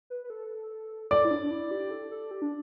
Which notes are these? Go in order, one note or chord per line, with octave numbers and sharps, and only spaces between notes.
B4
B4
A4
A4 D5
E4
D4
D4
E4
G4
A4
A4
G4
D4